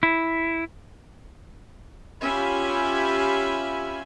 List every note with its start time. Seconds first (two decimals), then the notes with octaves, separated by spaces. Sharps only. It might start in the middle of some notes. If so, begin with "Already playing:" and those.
0.03 E4
2.22 C#4 F4 G4 E5 G#5 B5